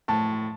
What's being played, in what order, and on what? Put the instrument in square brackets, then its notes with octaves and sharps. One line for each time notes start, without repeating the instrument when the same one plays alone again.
[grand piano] A2 [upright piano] A5